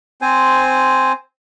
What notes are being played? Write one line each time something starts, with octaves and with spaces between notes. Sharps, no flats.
C4 C5 G#5